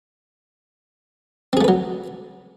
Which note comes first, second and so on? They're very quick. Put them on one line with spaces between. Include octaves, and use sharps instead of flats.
C4 G#4 A3 B4 F#3